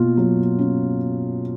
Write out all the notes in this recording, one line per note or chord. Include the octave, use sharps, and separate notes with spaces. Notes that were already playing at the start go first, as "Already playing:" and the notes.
Already playing: B2 A#3 F4
F#3
C#4